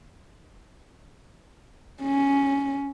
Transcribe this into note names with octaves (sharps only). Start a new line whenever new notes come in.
C#4